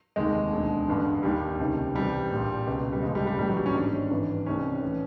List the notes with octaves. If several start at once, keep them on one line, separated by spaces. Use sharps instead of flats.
F1 D#2 D#3 G#3
E1 D2 D3
A1 G2 D3
D#2 D#3 G3
C#2 C3 D#3
C2 C3 E3 G3
A#1 A#2
C#2 B2
G3
F1 F2 C#3 G#3
G3
G3
A#1 A2 E3 G3
F#3
G3
C#4
G#1 G#2 D#3 D4
G#1 G2 E3
C2 C3 D#3 C#4
A2 E3